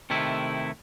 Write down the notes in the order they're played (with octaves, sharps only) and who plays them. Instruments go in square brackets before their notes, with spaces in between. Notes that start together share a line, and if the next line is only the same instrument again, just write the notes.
[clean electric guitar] C3 D#3 A3 E4